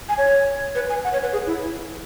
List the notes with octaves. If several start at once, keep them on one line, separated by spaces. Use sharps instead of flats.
G#5
C#5
B4
G#5
F#5
C#5
B4
G#4
E4